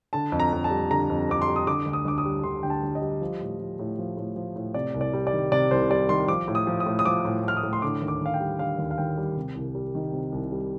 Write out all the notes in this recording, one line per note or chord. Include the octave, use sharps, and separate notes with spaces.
D3 A5
F2
A#5
F2
A5
G3
D3 A#5
F2
F2 D6
C6
G3
D#6
D3 D6
D2
D#6
D2 D6
D#6
G3
D3 C6
D2 G5
A5
D2
D#5
G3
F3
A2
F3
A2
F3
A2
F3
A2
C3 D5
C2
D5
G3
D5
D#3
C3 D5
C2 C5
G3 D5
D#3 C6
F3 D6
A2
D#6
F3
D#6
A2
D#6
F3 D6
A2
F3 F6
D#6
A2
C6
D3 D6
D#2
D6
D#2
F5
G5
G3
D3 F5
D#2
F5
D#2 G5
G3
C3
C2
G3
D#3
C3
C2
G3